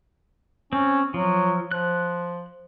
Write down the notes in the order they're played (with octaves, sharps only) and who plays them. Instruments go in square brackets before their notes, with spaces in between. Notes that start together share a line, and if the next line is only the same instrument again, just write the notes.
[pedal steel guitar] C4 [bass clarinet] C#4
[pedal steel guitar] F3 [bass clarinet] F#3
[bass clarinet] F3 [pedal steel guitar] F#6